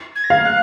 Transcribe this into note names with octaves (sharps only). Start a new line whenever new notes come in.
G#6
A#6
F5 G#6
F#6